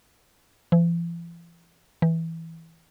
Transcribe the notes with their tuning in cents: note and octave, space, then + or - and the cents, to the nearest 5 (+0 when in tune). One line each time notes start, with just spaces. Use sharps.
E3 +45
E3 -10